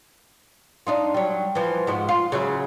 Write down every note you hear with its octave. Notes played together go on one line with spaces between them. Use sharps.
D4 D#4 F4
F#3 G3
E3 F3
G#2 F3 F#4
F4
C#3 F#3 E4